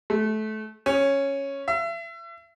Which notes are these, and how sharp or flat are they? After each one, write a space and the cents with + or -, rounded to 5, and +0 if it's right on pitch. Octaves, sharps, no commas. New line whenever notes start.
A3 -25
C#4 -5
E5 +35